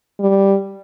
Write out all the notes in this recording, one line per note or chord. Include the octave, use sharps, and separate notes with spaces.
G3